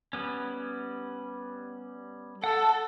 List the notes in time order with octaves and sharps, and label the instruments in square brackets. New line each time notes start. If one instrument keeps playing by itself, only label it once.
[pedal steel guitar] G3 B3 C#4
[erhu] A4 [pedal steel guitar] F#5 E6